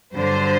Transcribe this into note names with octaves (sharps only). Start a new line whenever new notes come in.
G2 D3 F#3 C5